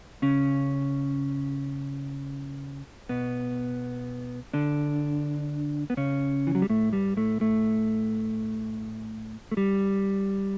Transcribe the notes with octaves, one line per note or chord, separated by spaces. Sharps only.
C#3 C#4
B2 B3
D3 D4
B3
C#3 C#4
E3
F#3
G3
A2 A3
G2 G3
A2 A3
A2 A3
A3
G3